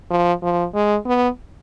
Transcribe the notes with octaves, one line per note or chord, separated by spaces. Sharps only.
F3
F3
G#3
B3